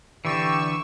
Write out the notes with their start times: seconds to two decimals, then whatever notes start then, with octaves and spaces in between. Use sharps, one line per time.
0.25 D3 E3 G4 D5 C#6 E6